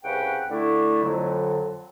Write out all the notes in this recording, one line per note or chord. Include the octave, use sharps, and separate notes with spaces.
C2 C#3 B4 F#5 G5
D3 A3 E4
F2 D3 F#3